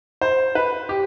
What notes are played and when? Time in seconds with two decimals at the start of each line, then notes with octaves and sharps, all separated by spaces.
0.21 C5
0.55 B4
0.89 G4